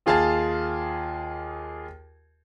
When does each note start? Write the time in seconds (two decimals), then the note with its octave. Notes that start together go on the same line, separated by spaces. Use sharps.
0.06 D#2 F4 G#4 A5 F6 A6